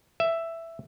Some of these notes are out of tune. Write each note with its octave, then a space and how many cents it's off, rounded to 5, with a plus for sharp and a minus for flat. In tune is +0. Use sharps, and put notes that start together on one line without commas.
E5 +5